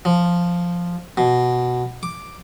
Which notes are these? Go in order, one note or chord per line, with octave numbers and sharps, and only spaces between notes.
F3
B2
D6